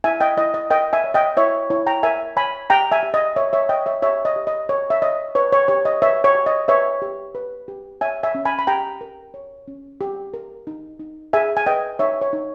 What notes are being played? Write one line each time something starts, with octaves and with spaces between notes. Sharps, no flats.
E4 E5 G#5
D#5 G5
E4 D#5
D#5
A#4 D#5 G5
E5 G#5
C#5
D#5 G5
E4 C#5 E5
E4 C#5
G5 A#5
A#4 E5 G#5
C#5 G#5 B5
G4 G5 A#5
E5 G#5
G4
D#5
A#4 C#5 E5
C#5 E5
C#5 D#5 G5
C#5 E5
G4 C#5 E5
D#5
G4
D#5
A#4 C#5
E5
C#5 D#5
B4 C#5
C#5
G4 C#5
D#5
B4 C#5 E5
C#5
G4
D#5
B4 C#5 E5
G4
B4
G4
C#5 E5 G#5
E5 G#5
C#4
G#5 B5
B5
G4 G5 A#5
A#4
C#5
C#4
G4
A#4
D#4
D#4
G#4 E5 G#5
G#5
B4 D#5 G5
D#4 C#5 E5
C#5
D#4